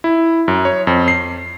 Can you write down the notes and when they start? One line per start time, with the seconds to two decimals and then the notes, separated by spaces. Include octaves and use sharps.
0.04 E4
0.48 F#2
0.65 C#5
0.87 F2
1.08 C7